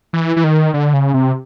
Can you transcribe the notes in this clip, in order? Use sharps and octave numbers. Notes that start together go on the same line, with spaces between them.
E3
E3
D#3
D3
C#3
C3